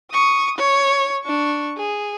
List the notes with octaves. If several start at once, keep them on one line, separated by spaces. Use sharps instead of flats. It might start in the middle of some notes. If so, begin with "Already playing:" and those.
C#6 D#6
C#5 C#6
D4 C#6
G#4